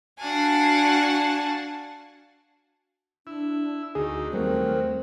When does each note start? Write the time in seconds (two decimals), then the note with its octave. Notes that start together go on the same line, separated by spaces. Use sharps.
0.19 D4 F#4 F5 F#5 G#5 A5
3.27 D4 E4
3.95 D2 D#4 F#4 G#4
4.33 D#2 F#3 G3 A3 C4 A#4